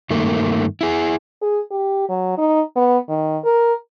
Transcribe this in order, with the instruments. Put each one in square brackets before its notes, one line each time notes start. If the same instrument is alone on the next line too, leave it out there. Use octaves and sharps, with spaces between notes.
[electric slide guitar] G2 D#3 A3 A#3
E4 G#4
[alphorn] G#4
G4
F#3
D#4
B3
D#3
A#4